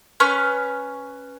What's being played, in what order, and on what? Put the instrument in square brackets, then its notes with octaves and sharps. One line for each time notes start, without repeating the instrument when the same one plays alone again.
[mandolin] C#4 B4 C#6 F6